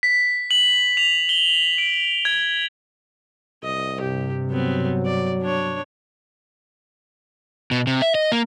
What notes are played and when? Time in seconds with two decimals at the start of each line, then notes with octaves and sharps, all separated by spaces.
0.03 B6
0.51 F#7
0.97 F7
1.29 G7
1.78 D7
2.25 G#6
3.63 C2 D#5
4.01 G2 C3 G4
4.51 F#3 B3 C4
5.05 D5
5.42 D4 C#5
7.71 B2
7.87 C3
8.02 E5
8.15 D#5
8.32 A#3